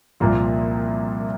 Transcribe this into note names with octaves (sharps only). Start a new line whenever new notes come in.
C2 A#2 F3 A#3 F4